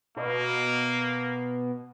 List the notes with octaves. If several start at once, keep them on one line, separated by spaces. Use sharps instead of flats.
B2 A#3